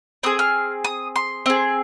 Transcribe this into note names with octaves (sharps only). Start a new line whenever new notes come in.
C4 G#4 D#6
F6
D#6
C6
C4 G#4